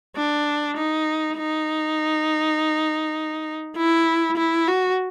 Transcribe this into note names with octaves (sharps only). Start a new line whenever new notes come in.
D4
D#4
D#4
E4
E4
F#4